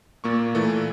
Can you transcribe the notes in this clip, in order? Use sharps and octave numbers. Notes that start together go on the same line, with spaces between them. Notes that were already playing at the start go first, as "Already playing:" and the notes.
A#2 A#3 C#6
A#2 E3 A3